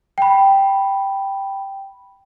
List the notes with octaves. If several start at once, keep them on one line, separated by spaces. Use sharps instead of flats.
G5 B5